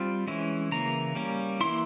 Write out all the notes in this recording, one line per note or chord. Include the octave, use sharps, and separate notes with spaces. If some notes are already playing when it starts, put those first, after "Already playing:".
Already playing: G3 C4 F4
E3 G#3 C#4 E4
C#3 E3 A#3 A#5
G3 A#3 C#4
E3 A#3 E4 C6